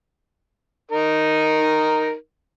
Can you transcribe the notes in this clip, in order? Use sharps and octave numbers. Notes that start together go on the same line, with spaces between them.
D#4 A#4